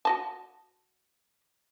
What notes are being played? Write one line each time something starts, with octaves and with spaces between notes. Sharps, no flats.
F#4 D#5 A5